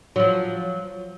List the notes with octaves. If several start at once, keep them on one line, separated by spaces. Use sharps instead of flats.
F3 F#3